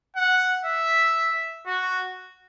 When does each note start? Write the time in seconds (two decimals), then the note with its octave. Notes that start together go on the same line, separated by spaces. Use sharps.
0.16 F#5
0.65 E5
1.67 F#4